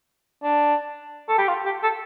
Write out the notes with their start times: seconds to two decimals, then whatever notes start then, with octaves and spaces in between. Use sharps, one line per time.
0.43 D4
1.28 A4
1.38 G4
1.48 F4
1.65 G4
1.83 A4